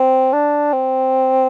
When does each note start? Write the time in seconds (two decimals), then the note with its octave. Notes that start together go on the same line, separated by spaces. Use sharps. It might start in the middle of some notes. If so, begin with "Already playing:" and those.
Already playing: C4
0.33 D4
0.73 C4